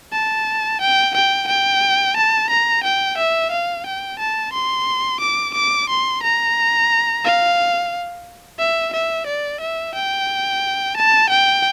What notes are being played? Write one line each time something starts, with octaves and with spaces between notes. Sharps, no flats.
A5
G5
G5
G5
A5
A#5
G5
E5
F5
G5
A5
C6
D6
D6
C6
A#5
F5
E5
E5
D5
E5
G5
A5
G5